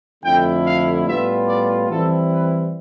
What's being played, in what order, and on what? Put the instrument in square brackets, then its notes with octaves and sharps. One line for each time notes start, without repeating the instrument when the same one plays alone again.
[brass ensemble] F2 D3 A3 E4 G5
F5
A2 G3 B3 F4 E5
D5
E3 G3 C4 E4 A4
B4